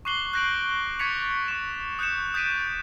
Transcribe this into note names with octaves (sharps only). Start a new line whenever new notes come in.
C#6 D6 F#6 C7 F#7 G7
F#6 G6 A#6 C7 D7 F#7
C#6 G#6 A6 B6 C#7 F7
C#6 E7
D#6 F#6 G6 C#7 E7
D#6 G6 A6 B6 D7 D#7